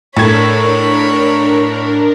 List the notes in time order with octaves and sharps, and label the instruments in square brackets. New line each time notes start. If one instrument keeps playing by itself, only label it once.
[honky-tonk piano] A2 A4 G#6 [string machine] D4 A#4 [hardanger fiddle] C#5 B5